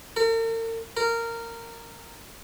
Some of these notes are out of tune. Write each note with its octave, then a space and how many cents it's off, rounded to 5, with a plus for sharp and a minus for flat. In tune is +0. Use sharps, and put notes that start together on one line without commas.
A#4 -45
A#4 -15